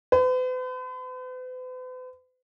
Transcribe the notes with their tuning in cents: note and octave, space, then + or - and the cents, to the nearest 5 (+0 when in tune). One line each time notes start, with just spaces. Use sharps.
B4 +45